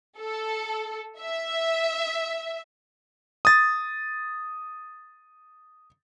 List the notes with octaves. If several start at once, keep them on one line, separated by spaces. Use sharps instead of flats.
A4
E5
D#6 A6